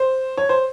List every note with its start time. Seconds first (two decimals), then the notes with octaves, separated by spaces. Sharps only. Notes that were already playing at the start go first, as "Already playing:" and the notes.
Already playing: C5
0.37 C#5
0.49 C5